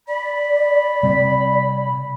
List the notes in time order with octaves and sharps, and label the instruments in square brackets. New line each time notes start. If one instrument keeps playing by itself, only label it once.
[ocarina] D5 [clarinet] B5
[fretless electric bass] C3 G3 C4